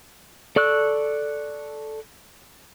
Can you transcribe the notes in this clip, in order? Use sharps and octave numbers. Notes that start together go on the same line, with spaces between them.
A4 D5 C#6 E6 F#6